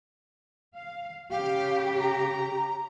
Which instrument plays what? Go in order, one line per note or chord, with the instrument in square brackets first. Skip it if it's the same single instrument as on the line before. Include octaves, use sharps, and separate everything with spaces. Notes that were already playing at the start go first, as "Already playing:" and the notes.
[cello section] F5
[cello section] C#3 G4 [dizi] F5
[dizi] A#5